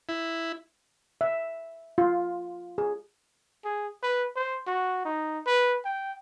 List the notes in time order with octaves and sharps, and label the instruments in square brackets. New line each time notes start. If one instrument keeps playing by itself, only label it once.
[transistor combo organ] E4
[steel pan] E5
F4
G#4
[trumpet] G#4
B4
C5
F#4
D#4
B4
G5